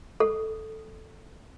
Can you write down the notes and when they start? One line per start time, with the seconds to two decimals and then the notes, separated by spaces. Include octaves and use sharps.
0.20 A4